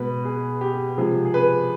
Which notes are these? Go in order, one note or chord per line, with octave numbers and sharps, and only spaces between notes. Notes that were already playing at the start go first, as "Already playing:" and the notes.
Already playing: B2 G#3 B4
G#4
G4
C3 F3 G#3 G#4
G#4
B4